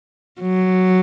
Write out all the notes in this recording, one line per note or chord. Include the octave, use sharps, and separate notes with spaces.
F#3